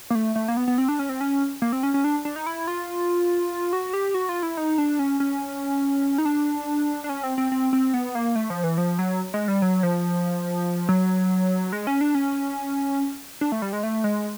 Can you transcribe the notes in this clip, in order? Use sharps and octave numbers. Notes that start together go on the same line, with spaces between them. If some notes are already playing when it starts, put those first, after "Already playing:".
A#3
A3
A3
A#3
B3
B3
C4
D4
C#4
C4
C#4
A#3
C4
C#4
C#4
D4
D4
D#4
E4
F4
F#4
G4
F#4
F4
E4
D#4
D4
C#4
C#4
D#4
D4
D4
C#4
C4
C4
C4
C4
B3
A#3
A3
F3
E3
F3
F#3
G#3
G3
F#3
F3
F#3
G#3
C#4
D4
C#4
D4
A3
G3
G#3
A3
G#3